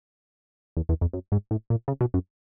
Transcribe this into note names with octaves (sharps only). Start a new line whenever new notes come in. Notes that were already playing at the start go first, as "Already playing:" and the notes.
E2
E2
F2
F#2
G#2
A2
A#2
C#3
B2
F#2